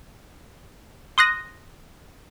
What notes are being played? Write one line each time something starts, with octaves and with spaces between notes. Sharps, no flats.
C6 D#6 F#6 A#6